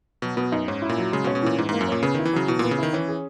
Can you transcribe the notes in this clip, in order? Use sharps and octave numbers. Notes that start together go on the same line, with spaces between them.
B2 F#3
B2 B3
F#2 D#4
G#2 C#4
E4
A#2
F#3
C#3 G#3
B2
C#4
B2
A#2 E3
G#2 E3
G#2 A#3
F#2
A#2 C#4
C#3 B3
D#3 E4
E3
C#3 F#3
B2 E3
A#2 B3
C#3
D#3 E4
E3 C#4
G#4